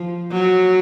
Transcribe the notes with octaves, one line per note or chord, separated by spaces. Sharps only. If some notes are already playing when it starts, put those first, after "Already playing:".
Already playing: F3
F#3